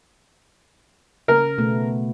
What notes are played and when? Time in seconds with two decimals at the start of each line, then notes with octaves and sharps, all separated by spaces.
1.28 C#3 A#4
1.58 B2 A3 B3